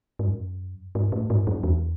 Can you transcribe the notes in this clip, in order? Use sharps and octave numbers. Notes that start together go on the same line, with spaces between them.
G#2
F#2
G#2
A2
G#2
F#2
E2